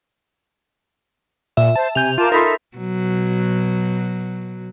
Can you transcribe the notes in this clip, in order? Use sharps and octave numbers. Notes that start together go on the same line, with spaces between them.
A#2 E5
C5 A5
C3 G#5 G6 F7
F4 A#4 A5 D6
D#4 A4 A#4 E5 B5 C6
B2 F#3